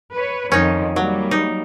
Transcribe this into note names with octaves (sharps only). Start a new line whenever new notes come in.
B4 C#5
F2 D#3 F3 C#4 D#4
F#3 G3 A#3
D#4